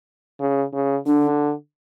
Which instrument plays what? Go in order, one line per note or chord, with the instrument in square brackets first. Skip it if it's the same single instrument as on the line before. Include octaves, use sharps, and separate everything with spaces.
[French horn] C#3
C#3
[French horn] D3 [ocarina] D4